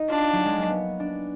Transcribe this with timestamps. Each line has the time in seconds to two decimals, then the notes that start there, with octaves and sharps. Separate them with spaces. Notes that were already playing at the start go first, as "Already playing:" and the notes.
Already playing: D#4
0.09 D4 F4
0.32 F#3
0.45 G#3
0.57 A#3
0.70 B3
1.00 D4